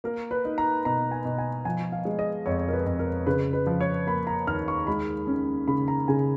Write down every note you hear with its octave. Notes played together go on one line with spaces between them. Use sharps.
A#3 A#4
B4
D#4
A#5
B2 A#5
G#5
B2
G#5
F3 G#5
F5
G#3
D#5
F2 C#5
A#4
B4
F2
A#4
C#3 B4
B4
F3
C#5
A#3 B5
A#5
D#2 F6
C#6
G#3 B5
C#4
C#3 B5
A#5
C#3 G#5